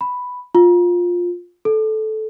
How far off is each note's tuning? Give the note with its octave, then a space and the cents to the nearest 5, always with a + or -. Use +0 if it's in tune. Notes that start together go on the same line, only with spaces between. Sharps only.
B5 +5
F4 +10
A4 -15